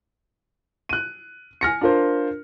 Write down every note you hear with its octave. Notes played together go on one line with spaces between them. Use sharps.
F#6 D#7
G#5 F6 A#6 C#7
D4 F4 A#4 C5